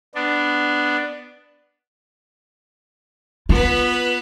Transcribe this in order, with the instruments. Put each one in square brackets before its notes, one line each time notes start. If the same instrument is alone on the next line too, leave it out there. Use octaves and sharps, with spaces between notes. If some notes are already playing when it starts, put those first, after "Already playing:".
[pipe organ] B3 D4
[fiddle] B3 B4 [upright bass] F4